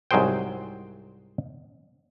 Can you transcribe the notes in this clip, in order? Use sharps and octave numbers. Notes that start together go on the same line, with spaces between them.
C2 G#2 F#3 G#4 C5 G5